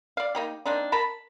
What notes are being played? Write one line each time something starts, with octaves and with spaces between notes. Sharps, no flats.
D5 F5
A#3 D#4 G4
A#3 C4 D4 D#4
A#4 A5 B5